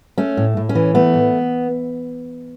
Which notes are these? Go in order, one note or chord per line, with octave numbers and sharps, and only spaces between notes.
A3 C#4
A2
A2
C#4
E3
A3 B3
A2